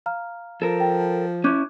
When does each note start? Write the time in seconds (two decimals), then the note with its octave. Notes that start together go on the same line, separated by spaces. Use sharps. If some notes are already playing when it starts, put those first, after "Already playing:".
0.06 F5 A#5 F6
0.62 F3 A4 A#4
0.80 G5
1.44 C#4 E4 D6 F#6 G6